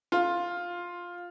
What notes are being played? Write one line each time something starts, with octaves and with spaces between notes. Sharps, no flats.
F4